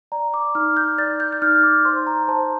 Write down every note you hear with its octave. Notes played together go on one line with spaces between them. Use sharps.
D5 A#5
D6
D#4 F6
G6
D5 A6
G6
G6
D#4 F6
D6
C5 C6
A#5
C5 A5